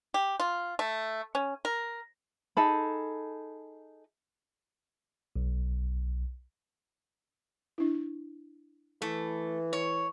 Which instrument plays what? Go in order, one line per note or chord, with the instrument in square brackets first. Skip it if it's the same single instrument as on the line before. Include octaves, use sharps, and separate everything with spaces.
[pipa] G4
F4
A3
C#4
A#4
[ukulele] D#4 G#4 A4 B5
[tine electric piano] B1
[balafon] D4 E4
[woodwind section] E3 [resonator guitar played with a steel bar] A3
[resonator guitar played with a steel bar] C#5